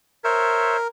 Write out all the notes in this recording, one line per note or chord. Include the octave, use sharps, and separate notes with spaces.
A#4 C5 C#5 E5